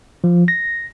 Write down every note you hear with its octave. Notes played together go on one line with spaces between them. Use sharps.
F3
A#6